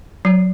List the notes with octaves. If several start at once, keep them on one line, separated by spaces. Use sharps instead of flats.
F#3